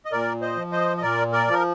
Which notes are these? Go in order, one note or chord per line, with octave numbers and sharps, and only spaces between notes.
D#5
A#2 A#4 D5
C5 D#5
F3
C5 D#5
D#5
A#2 A#4 D5
A#4 D5
F3 A#4